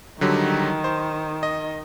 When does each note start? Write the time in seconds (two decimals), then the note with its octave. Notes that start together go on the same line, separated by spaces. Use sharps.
0.21 D3 D#3 F#3 G3
0.84 C5
1.43 D#5